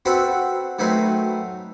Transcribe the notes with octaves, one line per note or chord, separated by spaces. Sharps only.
C4 F#4 A4 B4 F#5
D#3 F#3 A3 C4 B4